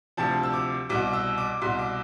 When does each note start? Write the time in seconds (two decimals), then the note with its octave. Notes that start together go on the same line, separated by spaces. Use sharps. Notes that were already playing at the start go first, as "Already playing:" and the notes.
0.17 D2 C3 F3 A5
0.43 E6
0.53 D6
0.89 C2 B2 D6
1.13 E6
1.38 D6
1.61 C2 B2 C6
1.79 D6